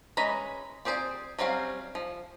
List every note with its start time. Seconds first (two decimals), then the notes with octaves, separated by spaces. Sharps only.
0.17 E3 G#3 C#4 A#5 B5
0.85 C4 G4 G#4 C5 D5
1.39 F#3 G3 C4 C#4 F5
1.95 F3